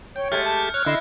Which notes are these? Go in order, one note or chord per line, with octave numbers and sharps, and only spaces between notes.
C#5 G5
G#3 A3 G4 F6 G6 A6 C#7
A5
C#5 F6 F#6 G#6
D3 E4 D#5 C6 E6